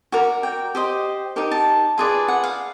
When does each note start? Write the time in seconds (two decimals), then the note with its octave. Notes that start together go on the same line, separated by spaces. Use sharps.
0.12 F#4 A#4 D5
0.43 G5
0.75 G4 C5 D#5
1.36 D#4 G4 A#4
1.51 A5
1.98 F4 G#4 B4 D5
2.28 F#5
2.44 F5